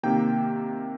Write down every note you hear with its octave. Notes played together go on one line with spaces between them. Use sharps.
C3 D#3 A#3 G5